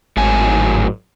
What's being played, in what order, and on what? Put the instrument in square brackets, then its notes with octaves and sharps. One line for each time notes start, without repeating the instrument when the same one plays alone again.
[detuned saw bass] G#1 [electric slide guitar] A2 F#3 G#5